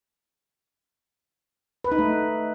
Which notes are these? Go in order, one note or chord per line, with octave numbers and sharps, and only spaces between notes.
B4
D#4
A3